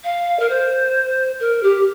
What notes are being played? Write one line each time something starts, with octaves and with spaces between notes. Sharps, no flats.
F5
A#4
C5
A#4
G4